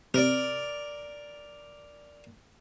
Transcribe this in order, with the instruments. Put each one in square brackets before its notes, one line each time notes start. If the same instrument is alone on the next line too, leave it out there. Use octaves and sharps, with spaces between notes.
[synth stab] C3 [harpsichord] A#4 D5